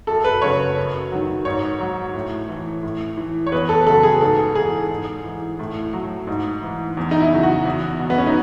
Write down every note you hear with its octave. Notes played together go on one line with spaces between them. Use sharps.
F#2 A4
B4
C#3 F#3 C#5
F#2
D#3 F#3
G#2 C#5
F#3
A2
E3
A2
E3
C#5
E2 B4
A4
B4
C#3 F#3 A4
G#4
G#2 A4
E3 G#4
G#2
E3
A2
F#3
G#2
E3
E2
D#4
E4
C#3 F#3
F#4
E2
B2 F#3
B3
C#4
D#4